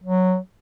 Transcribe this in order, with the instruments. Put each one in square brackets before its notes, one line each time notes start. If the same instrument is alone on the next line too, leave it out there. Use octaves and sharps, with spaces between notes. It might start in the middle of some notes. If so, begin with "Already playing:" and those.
[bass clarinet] F#3